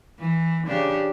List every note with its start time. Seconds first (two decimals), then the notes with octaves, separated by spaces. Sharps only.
0.19 E3
0.67 C#3 D4 G4